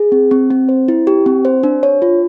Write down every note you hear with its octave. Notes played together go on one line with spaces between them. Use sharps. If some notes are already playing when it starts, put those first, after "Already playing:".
Already playing: G#4
C4
C4
C4
C5
E4
G4
C4
C5
D4
C#5
F4